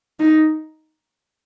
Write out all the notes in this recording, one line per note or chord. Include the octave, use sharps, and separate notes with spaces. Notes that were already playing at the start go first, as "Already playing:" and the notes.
D#4